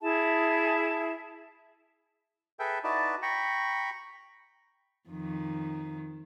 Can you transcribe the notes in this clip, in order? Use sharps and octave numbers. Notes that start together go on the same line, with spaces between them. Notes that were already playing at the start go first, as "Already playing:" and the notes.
E4 G#4 E5 A5
G#4 A4 B4 E5 G5
D#4 E4 F#4 B4 D5 A5
G5 A#5 B5 C#6
F2 D#3